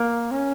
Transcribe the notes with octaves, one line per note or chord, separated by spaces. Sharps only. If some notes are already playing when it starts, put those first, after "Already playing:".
Already playing: A#3
C#4